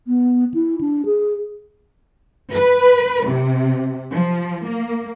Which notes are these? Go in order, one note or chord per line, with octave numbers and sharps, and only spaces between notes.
B3
E4
D4
G#4
B4
C3
F3
A#3